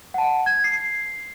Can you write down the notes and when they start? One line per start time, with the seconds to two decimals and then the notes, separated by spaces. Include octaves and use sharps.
0.14 F#5 A5
0.46 G#6
0.64 C7